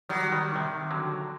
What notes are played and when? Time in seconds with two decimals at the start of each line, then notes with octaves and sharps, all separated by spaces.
0.09 D#3 F#3 G3
0.32 D#3 G3
0.56 C3 D#3
0.91 D3 F#3